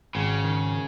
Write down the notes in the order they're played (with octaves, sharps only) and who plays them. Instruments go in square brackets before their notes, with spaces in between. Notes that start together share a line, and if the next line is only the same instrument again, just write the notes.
[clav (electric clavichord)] G#1 [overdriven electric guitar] C#3
[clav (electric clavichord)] D#3